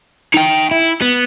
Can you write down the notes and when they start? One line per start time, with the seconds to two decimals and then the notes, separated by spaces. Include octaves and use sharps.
0.34 D#4 G5
0.71 E4
1.02 B3